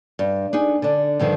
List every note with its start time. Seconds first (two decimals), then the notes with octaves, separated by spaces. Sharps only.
0.19 G2
0.53 D4 D#4 G#4
0.82 D3 D4
1.19 G2 D3 D#3 F3